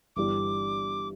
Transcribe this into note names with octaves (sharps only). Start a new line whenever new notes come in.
G1 G2 E3 G3 D6